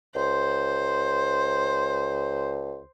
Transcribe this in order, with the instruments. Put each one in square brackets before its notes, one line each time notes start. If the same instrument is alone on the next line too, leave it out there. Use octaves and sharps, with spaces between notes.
[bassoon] C#2 [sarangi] C5